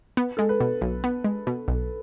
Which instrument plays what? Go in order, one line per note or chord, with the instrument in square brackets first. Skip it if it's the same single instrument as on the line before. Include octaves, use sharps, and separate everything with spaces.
[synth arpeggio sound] B3
[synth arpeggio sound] G#3 [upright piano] A4
[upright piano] B4
[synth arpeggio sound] B2
B1
B3
G#3
B2
B1